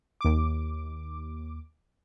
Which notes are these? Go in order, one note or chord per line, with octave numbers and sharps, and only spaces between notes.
D#2 D6